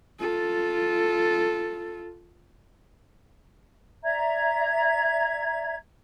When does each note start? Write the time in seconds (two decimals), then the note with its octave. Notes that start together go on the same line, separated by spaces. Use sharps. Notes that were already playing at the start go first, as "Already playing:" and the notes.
0.20 F4 A4
4.04 D5 E5 A#5 G#6